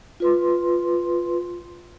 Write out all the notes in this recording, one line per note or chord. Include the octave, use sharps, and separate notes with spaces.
F4 B4 C6